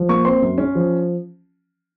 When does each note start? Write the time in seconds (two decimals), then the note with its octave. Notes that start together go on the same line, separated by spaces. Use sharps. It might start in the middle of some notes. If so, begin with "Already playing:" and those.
Already playing: F3
0.09 A#3 C#6
0.25 C4 C6
0.42 F#2
0.58 C#4
0.75 F3